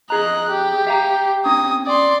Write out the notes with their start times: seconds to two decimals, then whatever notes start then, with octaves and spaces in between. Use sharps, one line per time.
0.10 F2 G#4 D#5 A#5 F#6
0.51 G4
0.87 E5 F5 A#5
1.46 C4 C#4 D#6
1.87 D5 C6